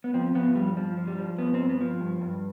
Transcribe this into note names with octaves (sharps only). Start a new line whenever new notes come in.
B3
F3 C4
F3 B3
G2 G3
G2 F3
F3
G3
F3
G2 B3
G2 C4
B3
F3
G2
G2